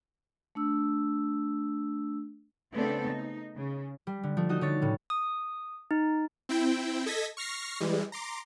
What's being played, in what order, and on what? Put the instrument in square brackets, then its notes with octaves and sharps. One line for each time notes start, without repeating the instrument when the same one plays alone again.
[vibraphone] A3 D4 E6
[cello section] C#3 A3 B3 C4 D4 A4
D#4
C#3
[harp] G3
D3
F3 A3
D#4 F#4 D#5
D3 C#5 A6
A2 C#3
[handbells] D#6
D#4
[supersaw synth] C4 E4 G5
A4 D#5 G#6 A#6 B6
C#6 F6 A#6 C7
E3 G3 G#3
A#5 C6 D6